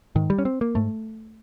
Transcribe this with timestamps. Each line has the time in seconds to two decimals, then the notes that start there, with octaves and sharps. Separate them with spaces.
0.15 G#2 D#3
0.30 G3
0.39 C#4
0.45 C4
0.61 A#3
0.75 G#2 A3